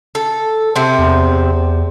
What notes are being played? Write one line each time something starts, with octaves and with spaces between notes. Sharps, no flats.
A4
C3 C4
E2